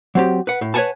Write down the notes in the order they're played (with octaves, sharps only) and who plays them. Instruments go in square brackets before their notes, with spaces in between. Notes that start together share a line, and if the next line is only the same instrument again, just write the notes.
[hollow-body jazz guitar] F#3 C4 G4
B4 F#5
A2
B4 C#5 D5 F#5 G#5 A5